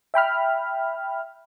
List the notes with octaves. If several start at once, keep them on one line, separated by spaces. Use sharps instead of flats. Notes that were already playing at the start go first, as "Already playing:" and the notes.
E5 G5 B5 F6